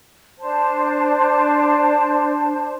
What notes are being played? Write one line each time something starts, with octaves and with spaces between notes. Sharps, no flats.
D4 C5 A5